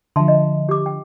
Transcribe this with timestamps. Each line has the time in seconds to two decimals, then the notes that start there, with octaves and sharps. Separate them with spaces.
0.16 D3 F3 E5 A5 C6
0.28 D#5
0.69 G4 D6
0.86 G5